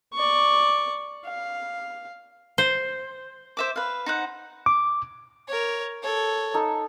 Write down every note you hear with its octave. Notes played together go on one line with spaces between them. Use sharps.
D5 C#6
F5
C5
C5 E5 D6
B4 F5
D#4 C5 F#5
D6
A#4 C#5
A4 C#5
D#4 A4